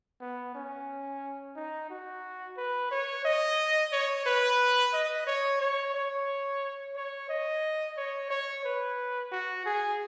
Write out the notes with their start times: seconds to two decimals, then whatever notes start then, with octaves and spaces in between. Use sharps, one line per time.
0.21 B3
0.55 C#4
1.56 D#4
1.90 F#4
2.57 B4
2.91 C#5
3.25 D#5
3.92 C#5
4.26 B4
4.93 D#5
5.27 C#5
5.61 C#5
5.94 C#5
6.96 C#5
7.29 D#5
7.97 C#5
8.31 C#5
8.65 B4
9.32 F#4
9.66 G#4